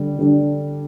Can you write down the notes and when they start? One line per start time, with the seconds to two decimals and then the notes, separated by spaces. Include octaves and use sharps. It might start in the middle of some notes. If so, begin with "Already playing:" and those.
Already playing: D3 G3
0.18 D3 G3 D4